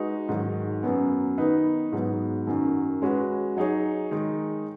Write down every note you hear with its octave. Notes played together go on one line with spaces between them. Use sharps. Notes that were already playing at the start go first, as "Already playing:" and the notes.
Already playing: G#3 D#4 F#4 B4
G#2 D#3 F#3
F#2 F#3 B3
D#3 B3 D#4 B4
G#2 F#3 B3
F#2 D#3 F#3
G#3 C#4 F#4 B4
F#3 D#4 G#4 C#5
D#3 G#3 D#4